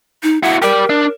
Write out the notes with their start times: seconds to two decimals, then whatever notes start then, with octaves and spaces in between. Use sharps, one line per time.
0.23 D#4
0.43 E4 F#4 F#5
0.62 G4 A#4 D5
0.89 D4